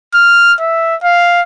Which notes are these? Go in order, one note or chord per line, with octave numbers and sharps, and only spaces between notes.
F6
E5
F5